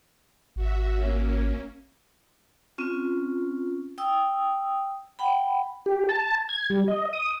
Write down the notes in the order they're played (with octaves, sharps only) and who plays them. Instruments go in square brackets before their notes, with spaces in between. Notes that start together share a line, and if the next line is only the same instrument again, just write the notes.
[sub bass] G#1 [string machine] F#4 E5
[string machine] A#3 C#4
[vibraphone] C4 C#4 F4
G5 D#6 E6
F#5 G5 B5
[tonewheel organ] G4
A5
G#6
G3
D#5
D#6